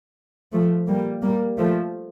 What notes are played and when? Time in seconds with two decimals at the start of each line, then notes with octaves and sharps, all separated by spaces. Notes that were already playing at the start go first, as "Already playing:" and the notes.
0.52 F3 A3
0.87 G3 A#3
1.22 G3 A#3
1.57 F3 A3